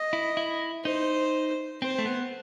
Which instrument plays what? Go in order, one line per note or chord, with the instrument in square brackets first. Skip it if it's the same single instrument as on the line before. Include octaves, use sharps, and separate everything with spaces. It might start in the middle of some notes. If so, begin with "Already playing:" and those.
Already playing: [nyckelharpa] D#5
[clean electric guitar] E4
E4
[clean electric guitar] D#4 [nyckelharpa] C5
[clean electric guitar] C4 [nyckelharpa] C5
[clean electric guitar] A3
B3